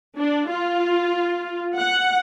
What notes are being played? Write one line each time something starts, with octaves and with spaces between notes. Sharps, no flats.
D4
F4
F#5